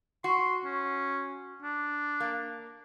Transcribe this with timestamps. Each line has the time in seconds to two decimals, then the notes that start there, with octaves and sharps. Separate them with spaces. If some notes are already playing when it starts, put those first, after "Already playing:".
0.24 F#4 C6
0.65 C#4
1.62 D4
2.20 A#3